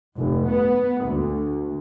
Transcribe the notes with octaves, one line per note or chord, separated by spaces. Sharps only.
F1
B3
D2